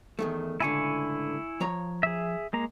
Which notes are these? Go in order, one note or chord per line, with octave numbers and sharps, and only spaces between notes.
E2 D#3 A3
C#2 A2 D3 E4 G#5 C#6
F3 C#5 A#5
G#4 E5
G#3 A#3 A#5